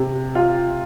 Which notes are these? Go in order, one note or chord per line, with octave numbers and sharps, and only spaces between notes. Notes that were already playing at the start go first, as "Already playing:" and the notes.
Already playing: C3
F4